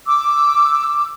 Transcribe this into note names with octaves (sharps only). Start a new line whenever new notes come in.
D6 E6